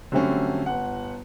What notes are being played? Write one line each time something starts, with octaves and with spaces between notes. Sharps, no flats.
D3 F#3 G3 A3 C4 C#4
G1 F#5